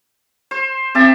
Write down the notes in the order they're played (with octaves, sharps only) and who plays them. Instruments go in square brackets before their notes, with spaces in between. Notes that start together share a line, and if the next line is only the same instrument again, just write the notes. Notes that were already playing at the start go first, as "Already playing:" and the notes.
[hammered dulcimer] C5
[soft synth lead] C4 [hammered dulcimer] G4 E5 A5